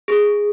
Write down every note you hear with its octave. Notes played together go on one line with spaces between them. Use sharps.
G#4